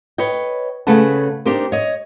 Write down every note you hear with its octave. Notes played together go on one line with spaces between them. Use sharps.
B4 C#5 D#5 G5
C#3 A3 G#4 B4 F#5 A5
D4 D#4 G4 A#4 C5
C#5 D#5